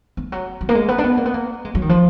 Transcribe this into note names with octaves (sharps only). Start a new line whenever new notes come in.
B3
F3
F#3
F#3
A#3
G#3
B3
D4
B3
A#3
B3
A#3
G#3
F#3
D#3
F3